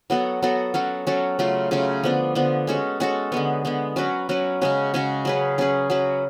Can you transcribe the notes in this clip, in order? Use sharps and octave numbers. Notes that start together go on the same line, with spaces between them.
F#3 B3 F#4 A4
F#3 B3 F#4 A4
F#3 C#4 F#4 A4
F#3 C#4 F#4 A4
C#3 F#3 A3 F4
C#3 F#3 A3 F4
D3 F3 B3 D4
D3 F3 B3 D4
G#3 C#4 F#4 A4
G#3 C#4 F#4 A4
D3 G#3 B3
D3 G#3 B3
F#3 C#4 F#4 B4
F#3 C#4 F#4 B4
C#3 G#3 C#4 F#4
C#3 G#3 C#4 F#4
F#3 C#4 G#4 B4
F#3 C#4 G#4 B4
F#3 C#4 F#4 B4